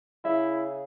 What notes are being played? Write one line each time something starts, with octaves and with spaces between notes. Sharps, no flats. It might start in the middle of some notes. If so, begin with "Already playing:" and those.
C#3 E4 E5